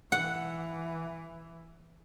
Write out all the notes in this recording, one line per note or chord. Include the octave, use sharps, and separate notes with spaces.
E3 F#5